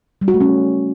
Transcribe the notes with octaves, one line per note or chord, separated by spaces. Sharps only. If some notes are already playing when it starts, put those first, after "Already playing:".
G3
F#4
A3
C#4